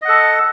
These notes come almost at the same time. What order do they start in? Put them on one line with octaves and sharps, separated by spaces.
D#5 F#5 A4